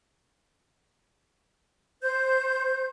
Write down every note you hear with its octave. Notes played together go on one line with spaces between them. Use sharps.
C5 G6